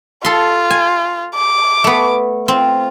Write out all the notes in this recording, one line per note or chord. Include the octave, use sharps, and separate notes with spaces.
F4 A4 C6
G#5
D6
A3 B3
C4 F4